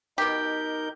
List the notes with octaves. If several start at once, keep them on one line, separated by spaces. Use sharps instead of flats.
B2 D#4 G4 A#4 G6